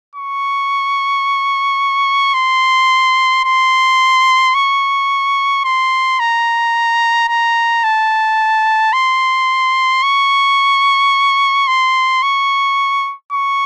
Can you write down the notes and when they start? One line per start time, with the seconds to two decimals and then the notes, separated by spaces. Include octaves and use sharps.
0.15 C#6
2.34 C6
3.45 C6
4.55 C#6
5.65 C6
6.19 A#5
7.28 A#5
7.84 A5
8.93 C6
10.03 C#6
11.68 C6
12.23 C#6
13.32 C#6